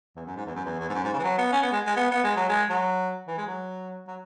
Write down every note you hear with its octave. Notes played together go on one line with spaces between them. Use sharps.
E2
F#2
G#2
E2
F#2
E2
E2
G#2
F#2
G#2
C#3
E3
F#3
B3
C#4
B3
G#3
G#3
B3
B3
G#3
F#3
G#3
F#3
E3
G#3
F#3
F#3